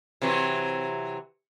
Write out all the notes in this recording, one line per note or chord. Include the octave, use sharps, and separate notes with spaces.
C3 E3 F#3